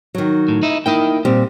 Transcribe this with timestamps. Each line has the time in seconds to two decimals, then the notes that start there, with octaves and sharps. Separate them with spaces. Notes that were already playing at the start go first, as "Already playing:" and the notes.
0.15 D#3 F#3
0.49 A2
0.63 D#4 E4
0.86 A#3 D#4 E4 G5
1.25 A#2 G3 C4 G4